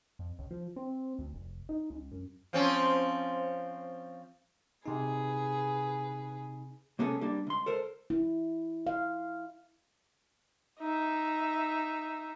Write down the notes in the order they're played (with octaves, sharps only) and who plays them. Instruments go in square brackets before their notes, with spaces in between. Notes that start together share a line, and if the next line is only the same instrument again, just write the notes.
[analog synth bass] F2
C#2
F3
C4
D2
F1
D#4
C#2
F#2
[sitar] F3 C4 C#4
[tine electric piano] C3 D#4 [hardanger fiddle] G#4 B4
[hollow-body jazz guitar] C3 A#3 B3 C#4 G#4 A4
G3 A#3 D4
C#2 C6
A4 A#4 C5
[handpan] E4
F5
[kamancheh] D#4 E5